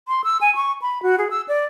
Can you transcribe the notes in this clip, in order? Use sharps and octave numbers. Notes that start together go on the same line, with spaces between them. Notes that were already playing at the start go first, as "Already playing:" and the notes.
C6
E6
G#5
C#6
B5
F#4
G#4
E6
D5